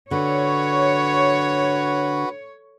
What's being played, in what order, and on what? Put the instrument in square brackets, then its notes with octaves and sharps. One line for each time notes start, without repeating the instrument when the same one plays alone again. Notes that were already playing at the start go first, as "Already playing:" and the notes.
[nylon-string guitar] D3 [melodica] F#4 B4 [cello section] C#5